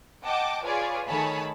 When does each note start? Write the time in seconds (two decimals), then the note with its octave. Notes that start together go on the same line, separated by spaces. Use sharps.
0.25 D#5 F#5 G5 A5 D6
0.64 F4 G#4 B4 C#5 D5
1.08 D#3 A3 G#4 C#5 A5 B5